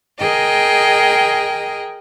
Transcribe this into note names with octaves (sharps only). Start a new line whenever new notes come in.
G#4 A#4 D#5 G5